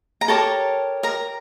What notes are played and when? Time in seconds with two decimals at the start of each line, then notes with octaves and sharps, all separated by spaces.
0.21 A#5
0.28 G4 A4 A#4 C#5 A5
1.03 A#4 A#5